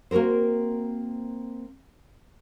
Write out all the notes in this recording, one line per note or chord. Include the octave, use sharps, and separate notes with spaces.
A#3 C4 F#4 A#4 C5